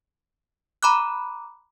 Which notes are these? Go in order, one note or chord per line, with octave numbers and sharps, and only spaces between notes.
A#5 B5 D6 F#6